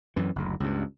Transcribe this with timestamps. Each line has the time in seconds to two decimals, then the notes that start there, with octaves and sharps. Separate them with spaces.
0.16 F#2 E3
0.36 F#1 D2
0.60 C#2 G2